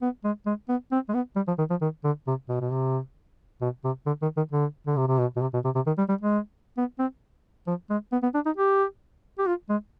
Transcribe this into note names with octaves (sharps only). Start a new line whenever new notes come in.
B3
G#3
G#3
B3
C4
G#3
B3
G3
F3
D#3
F3
D#3
D3
C3
B2
B2
C3
B2
C3
D3
D#3
D#3
D3
D3
C3
C3
B2
B2
C3
B2
C3
C3
D#3
G3
G3
G#3
B3
C4
F3
G#3
B3
B3
D4
D#4
G4
G4
F4
G#3